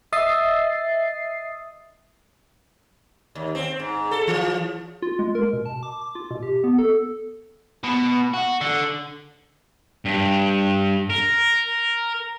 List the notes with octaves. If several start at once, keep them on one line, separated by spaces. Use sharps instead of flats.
D#5 E5 D#6 A6 C7
D#2
C4
G#2
A4
E3
F4
G#3
A#4
B2
A5
D6
D6
F4
B2
G4
B3
A4
B2
F#4
D3
G2
A#4